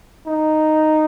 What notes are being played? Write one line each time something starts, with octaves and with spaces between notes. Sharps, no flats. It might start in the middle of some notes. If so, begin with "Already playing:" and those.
D#4